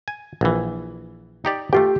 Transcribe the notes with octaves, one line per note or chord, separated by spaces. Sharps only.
G#5
A#1 E3
D#4 G4 D5
A3 F4 G4 G5